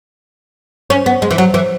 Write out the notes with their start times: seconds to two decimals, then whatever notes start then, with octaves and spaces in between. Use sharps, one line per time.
0.90 C#4
1.06 B3
1.22 G#3
1.31 E3
1.38 F#3
1.54 E3